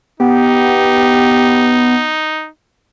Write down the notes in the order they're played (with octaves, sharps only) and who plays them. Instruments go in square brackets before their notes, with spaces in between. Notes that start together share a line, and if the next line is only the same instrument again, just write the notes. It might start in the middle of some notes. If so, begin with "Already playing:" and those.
[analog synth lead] B3 [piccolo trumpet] D#4 [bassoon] G4